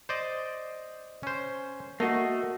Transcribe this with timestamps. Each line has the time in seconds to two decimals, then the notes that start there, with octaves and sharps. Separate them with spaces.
0.09 C5 D5 D#5
1.23 C#4 C5
2.00 A3 A#3 F#4 D#5